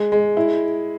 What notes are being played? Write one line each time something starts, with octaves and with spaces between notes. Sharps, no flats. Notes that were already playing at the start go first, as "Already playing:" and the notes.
Already playing: G#3
G#3
E4